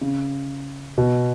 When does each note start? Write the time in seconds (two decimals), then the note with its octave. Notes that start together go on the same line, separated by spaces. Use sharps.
0.01 C#3
0.98 B2